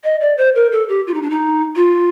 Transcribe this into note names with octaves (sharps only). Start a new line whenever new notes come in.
D#5
D5
C5
A#4
A4
G4
F4
D#4
D4
D#4
F4